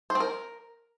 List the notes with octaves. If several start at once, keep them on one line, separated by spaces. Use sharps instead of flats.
C5
C4
A#4